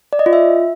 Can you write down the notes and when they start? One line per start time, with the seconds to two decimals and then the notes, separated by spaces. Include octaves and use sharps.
0.13 D5
0.19 D#5
0.26 F4
0.33 E5